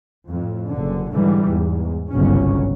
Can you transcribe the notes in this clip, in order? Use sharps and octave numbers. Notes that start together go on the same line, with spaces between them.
F2 A2
F#1 D3
G#2 D3 E3 G3
E2 G#2
G1 C2 G#2 C#3 F#3 C#4